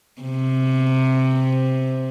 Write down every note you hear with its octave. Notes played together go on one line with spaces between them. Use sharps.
C3